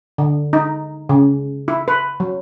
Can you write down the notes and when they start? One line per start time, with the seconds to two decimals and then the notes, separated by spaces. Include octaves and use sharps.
0.18 D3
0.53 D#4
1.09 C#3
1.68 E4
1.88 B4
2.20 F#3